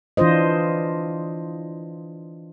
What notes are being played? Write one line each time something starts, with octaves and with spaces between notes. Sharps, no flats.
E3 D4 F4 C5 D#5